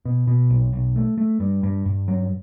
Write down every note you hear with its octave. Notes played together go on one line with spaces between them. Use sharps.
B2
B2
B1
B1
A3
A3
G2
G2
G2
F#3